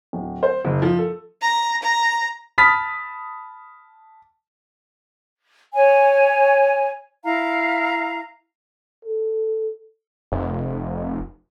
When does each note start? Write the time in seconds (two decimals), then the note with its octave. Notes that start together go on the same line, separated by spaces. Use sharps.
0.13 D1
0.43 C5
0.65 F#1
0.82 F3
0.98 A4
1.41 A#5
1.83 A#5
2.58 A5 B5 D#6 F6 A6 B6
5.74 C#5 G#5
7.23 E4 F5 A#5
9.05 A4
10.32 F1